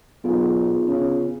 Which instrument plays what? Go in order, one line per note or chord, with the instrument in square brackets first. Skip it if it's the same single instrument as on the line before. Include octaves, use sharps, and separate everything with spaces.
[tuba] B1 [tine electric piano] B3 F4 G#4
[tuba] C#3